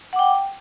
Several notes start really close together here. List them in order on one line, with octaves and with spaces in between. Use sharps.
F#5 D6 G5